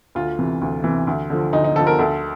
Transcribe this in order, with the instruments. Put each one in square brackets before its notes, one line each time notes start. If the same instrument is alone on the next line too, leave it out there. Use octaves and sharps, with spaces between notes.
[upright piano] D2 F4
C3 E3
D2
C3 E3
D2
D3 F3
D2 D#4
D#4
D3 A4
F3
A#4
D2 A4